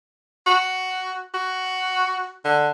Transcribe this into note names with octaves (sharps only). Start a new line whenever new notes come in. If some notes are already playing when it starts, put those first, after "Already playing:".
F#4
F#4
D3